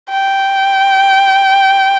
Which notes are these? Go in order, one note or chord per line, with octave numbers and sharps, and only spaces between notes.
G5